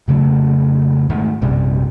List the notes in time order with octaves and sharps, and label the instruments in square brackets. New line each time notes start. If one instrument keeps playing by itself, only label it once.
[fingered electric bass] F2 C#3 F#3 A3
G#2 D#3 A3
A#1 F#2 C3 G3